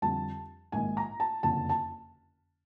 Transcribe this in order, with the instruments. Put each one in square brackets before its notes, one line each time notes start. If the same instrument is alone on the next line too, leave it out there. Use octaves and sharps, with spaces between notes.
[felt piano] F2 D3 G3 A5
A#1 G#2 D#3 G#5
A#5
A5
F#1 F2 D3 A5
A5